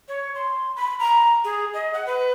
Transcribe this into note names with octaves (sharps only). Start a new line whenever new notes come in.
C#5
C6
B5
A#5
G#4
D#5
F#5
B4